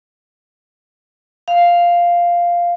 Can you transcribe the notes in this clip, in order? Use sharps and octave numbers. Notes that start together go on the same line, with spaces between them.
F5